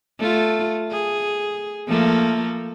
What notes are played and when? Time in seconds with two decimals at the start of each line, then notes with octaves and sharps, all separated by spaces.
0.19 A3 F4
0.91 G#4
1.88 F3 A3 A#3